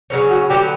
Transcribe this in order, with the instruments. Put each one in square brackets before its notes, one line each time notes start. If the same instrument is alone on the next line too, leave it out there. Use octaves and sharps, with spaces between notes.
[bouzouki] C#3 F#3 A#3 C#4
[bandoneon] F#4
[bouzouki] D3 F#3 B3 [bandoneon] G4